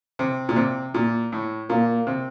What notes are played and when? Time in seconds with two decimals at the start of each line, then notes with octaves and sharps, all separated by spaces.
0.19 C3
0.49 A#2
0.56 C3
0.94 A#2
1.32 A2
1.70 A#2 A#3
2.07 C3